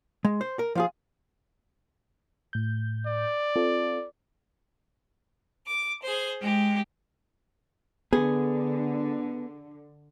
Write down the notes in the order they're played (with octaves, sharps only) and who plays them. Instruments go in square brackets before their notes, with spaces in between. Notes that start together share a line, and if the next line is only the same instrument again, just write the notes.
[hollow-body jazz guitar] G#3
C5
A#4
F3 F4 G#4
[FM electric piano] A2 G6
[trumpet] D5
[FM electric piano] C4 F4 A4
[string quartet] D6
G#4 C5
G#3 G4
[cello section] D3 [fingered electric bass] B3 [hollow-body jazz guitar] G#4